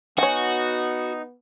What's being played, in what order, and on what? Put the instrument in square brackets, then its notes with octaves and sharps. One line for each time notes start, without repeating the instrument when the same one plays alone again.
[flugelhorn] B3 [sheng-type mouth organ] D#4 [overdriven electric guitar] F#4 [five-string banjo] C#5 G#5